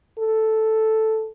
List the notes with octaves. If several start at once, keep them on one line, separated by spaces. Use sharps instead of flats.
A4